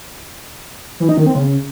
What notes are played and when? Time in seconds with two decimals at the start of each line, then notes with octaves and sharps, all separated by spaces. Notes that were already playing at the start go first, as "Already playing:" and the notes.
1.00 E3
1.09 D#4
1.18 D#3
1.26 C4
1.35 C#3